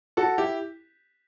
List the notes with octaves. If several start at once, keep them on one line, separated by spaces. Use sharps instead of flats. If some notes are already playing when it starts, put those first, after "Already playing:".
F#4 A4
E4 G4